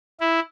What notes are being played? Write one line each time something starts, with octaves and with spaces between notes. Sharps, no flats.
E4